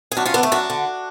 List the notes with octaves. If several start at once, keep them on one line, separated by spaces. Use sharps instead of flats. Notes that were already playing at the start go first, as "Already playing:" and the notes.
G#4
F#2 D4 F#4
C#4 F4
D3 B3 D4
A3
F#2 D4 F#4
D3